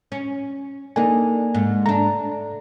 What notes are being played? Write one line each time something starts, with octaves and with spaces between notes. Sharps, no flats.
C#4
A#3 D4 D#4 A4 G#5
G#2
A3 D4 A#5